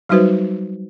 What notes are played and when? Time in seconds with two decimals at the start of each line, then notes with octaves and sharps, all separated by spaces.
0.09 F#3 G3 D#4 F#4 B4 C5